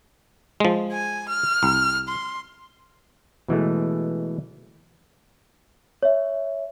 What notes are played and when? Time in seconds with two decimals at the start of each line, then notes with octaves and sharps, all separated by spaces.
0.60 F3 G#3
0.92 G#5
1.29 F6
1.63 C2
2.08 C6
3.48 B2 E3 G#3 A3
6.03 C#5 E5